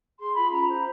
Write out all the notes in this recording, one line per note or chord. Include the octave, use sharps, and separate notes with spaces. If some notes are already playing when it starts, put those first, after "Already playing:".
G#4 C6
F4 B5
C#4 A#5
C5 A#5